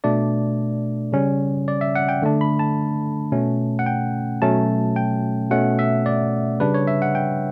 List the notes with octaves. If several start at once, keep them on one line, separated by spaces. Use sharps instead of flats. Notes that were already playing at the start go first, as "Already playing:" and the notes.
B2 A3 D4 D5
C#3 G3 C#4
D5
E5
F#5
G5
D3 A3 D4
B5
A5
B2 A3 C#4
F#5
G5
B2 F#3 A3 C#4 A5
G5
B2 A3 C#4 F#5
E5
D5
C#3 G3 D4 B4
C#5
E5
F#5
G5